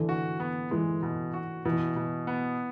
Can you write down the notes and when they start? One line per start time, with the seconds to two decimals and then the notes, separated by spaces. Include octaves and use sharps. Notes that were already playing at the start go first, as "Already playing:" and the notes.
Already playing: D3 E3
0.09 F#4
0.40 B3
0.71 E3 G#3
1.02 B2
1.34 F#4
1.65 B2 E3
1.96 B2
2.27 B3